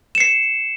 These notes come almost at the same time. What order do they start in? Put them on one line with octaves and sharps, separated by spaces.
E7 C#7 C7